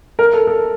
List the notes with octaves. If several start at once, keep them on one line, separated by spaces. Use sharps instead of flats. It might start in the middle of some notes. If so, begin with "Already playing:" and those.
A#4
A4
A4